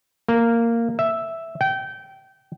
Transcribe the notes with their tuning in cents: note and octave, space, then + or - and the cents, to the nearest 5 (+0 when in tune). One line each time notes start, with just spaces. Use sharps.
A#3 -10
E5 +0
G5 -25